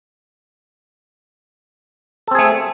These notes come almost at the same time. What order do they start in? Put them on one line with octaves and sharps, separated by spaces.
A4 C4 G#4 A3